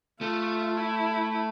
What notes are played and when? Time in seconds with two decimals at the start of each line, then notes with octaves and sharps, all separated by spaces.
0.20 A3 F4
0.77 E4